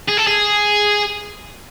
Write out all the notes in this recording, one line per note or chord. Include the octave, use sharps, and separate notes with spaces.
G#4
A4
G#4